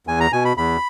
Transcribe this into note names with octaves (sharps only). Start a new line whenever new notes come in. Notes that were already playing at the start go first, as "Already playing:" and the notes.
E2 G#5
A#5
B2 G#5
B5
E2 B5